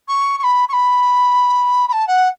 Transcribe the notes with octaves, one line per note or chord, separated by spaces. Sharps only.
C#6
C#6
B5
C#6
B5
B5
A5
F#5